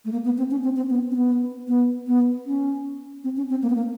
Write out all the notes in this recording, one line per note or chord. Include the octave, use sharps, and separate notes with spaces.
A3
A#3
B3
C4
C#4
C4
C4
B3
C4
B3
B3
B3
C#4
C4
C#4
C4
A#3
B3
A#3